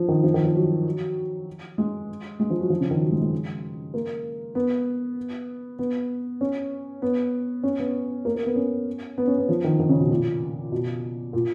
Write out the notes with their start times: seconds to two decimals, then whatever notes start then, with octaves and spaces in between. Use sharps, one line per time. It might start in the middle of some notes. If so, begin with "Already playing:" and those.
Already playing: F3
0.08 D#3
0.24 F3
0.34 D#3
0.44 F3
0.55 F#3
1.78 G#3
2.40 G#3
2.50 F3
2.60 F#3
2.70 F3
2.81 C#3
2.91 D#3
3.01 F#3
3.11 G#3
3.22 G#3
3.94 A#3
4.55 B3
5.79 B3
6.41 C#4
7.02 B3
7.63 C#4
7.79 B3
8.25 A#3
8.35 A#3
8.46 B3
8.56 C#4
9.18 B3
9.27 C#4
9.38 B3
9.49 F3
9.64 D#3
9.80 D#3
9.89 C#3
10.00 B2
10.11 A#2
10.72 B2
11.33 A#2